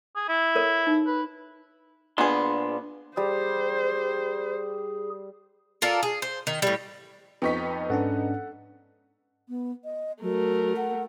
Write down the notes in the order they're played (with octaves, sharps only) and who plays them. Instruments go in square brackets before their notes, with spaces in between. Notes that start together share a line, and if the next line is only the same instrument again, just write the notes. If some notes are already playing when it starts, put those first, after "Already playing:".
[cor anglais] G#4
E4
[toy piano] A4 A#4 C#5
D#4
[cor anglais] B4
[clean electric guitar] A#2 D4 C6 [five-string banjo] B3 G#4
[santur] G3 [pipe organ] G#4 [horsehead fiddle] C5
[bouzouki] F4 A4 A#4 D5
G#4
C5
D#3
A2 G3
[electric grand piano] F2 G5 C#6 [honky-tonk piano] B3 D#4 B6
[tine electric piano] G#2 C#4 D4 [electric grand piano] A4 F#5
[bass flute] B3
D#5
[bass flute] F#3 [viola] A3 A#4
[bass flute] F#5